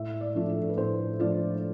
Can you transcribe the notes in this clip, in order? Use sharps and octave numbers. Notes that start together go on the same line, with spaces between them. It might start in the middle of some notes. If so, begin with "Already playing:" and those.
Already playing: A2 E5
D5
F3 A3 D4 F4
A4
A4
B4
A2 C5
F3 A3 D4 F4 D5